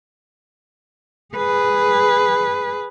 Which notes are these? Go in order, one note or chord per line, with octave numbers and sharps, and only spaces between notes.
G#4 B4